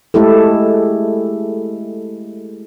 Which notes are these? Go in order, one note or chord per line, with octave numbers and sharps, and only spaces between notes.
G#3 A3 E4 G4 A4